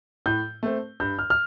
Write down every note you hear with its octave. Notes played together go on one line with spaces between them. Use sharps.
A2 G6
A3 C4
G2 G6
F6
F6